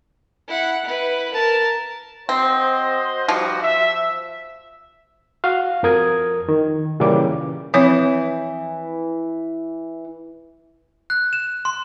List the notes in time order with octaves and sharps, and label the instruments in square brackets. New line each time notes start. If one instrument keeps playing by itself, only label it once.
[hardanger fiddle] E4 F#5
E4 B4
A#4 A5
[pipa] C4 [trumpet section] F#4 C5 D#5
[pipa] F3 [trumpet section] G3 D#4 F#4
[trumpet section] E5
[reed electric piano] F#4 F5
F2 F3 A#4 D#6 G#6
D#3
A#2 C#3 E3 G3 A#3 D6
[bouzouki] E3 [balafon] F3 C4 C#5
[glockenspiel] F#6
E7
C6